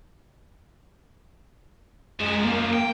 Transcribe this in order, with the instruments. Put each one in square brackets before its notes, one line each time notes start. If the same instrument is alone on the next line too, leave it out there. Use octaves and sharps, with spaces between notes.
[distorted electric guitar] F#2 F3 [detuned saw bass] G#3
[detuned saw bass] A#3
[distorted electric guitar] G5